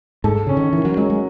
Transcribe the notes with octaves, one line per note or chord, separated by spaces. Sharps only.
G#2 A4
C#3 C#4
D#3
D#3 E3
F#3
F#3 G#3
G#3